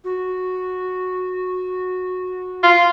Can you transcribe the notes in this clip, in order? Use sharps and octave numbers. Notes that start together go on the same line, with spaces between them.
F#4
F4